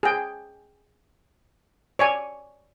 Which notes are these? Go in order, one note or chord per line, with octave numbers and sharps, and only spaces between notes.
G#4 G5
C#5 D5 G#5